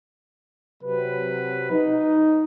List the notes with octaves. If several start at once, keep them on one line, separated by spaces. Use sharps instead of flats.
C3 F#3 B4
D#4